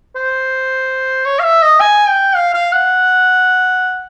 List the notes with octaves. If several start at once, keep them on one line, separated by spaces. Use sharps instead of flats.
C5
C#5
F5
E5
D#5
G#5
G5
F5
F5
F#5